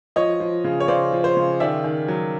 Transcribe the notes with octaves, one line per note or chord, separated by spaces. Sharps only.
F3 C#5 D#5
F3
C#3
C#5
C#3 C5 D5
F3
C5
C#3
D#3 D5 E5
D#3
F#3